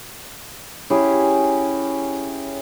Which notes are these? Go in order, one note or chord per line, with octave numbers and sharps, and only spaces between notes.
C#4 E4 G4 G#4